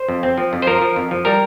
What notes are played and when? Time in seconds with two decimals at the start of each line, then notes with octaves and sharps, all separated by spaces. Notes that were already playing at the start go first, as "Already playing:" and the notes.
Already playing: C5
0.09 F2
0.23 C4
0.38 F3
0.53 F2
0.62 C5
0.67 F3 A#4
0.81 F3
0.96 F2
1.11 F3
1.25 G3 A#4